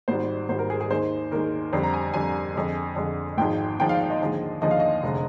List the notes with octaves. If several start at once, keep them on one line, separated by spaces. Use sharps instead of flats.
G#1 G#2 G3 C5
G#1 G#2 G3 C5
A#4
G#4
G#4
D#2 D#3 G#3 C5
D#2 D#3 G#3 A#4
F2 D3 G3 C5
A#5
G#5
F2 D3 G3 G#5
F2 D3 G#3
F2 D3 G#3
G#1 G#2 F3 G#3 G5
G#1 G#2 F3 G#3 G5
F5
F5
D#5
D#2 D3 F3 G#3
D#2 D3 F3 G#3 D#5
F5
D#5
F1 D3 G#3